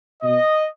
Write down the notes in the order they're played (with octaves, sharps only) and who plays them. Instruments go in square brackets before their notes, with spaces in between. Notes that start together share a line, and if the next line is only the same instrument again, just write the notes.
[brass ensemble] B2 D#5